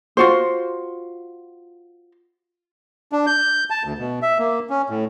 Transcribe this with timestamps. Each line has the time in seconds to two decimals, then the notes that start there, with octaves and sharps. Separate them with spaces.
0.17 F4 F#4 C5
3.12 D4
3.27 G6
3.70 A5
3.83 D2
3.98 B2
4.22 E5
4.38 A#3
4.70 C#4
4.90 A2